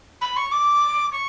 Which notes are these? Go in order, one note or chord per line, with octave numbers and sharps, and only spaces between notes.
B5
C#6
D6
C#6